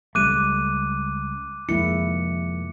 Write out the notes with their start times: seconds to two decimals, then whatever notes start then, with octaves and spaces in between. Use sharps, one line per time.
0.15 C#2 G3 A3 D6 F#6 D#7
1.69 F1 F2 D#3 G#3 A#3 E4 C#7